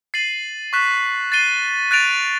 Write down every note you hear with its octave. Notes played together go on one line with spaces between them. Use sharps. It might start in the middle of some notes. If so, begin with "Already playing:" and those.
A6 C7 D#7 F#7
C#6 F#6 B6 E7
A6 C7 D#7 G7
F#6 A6 D7 F7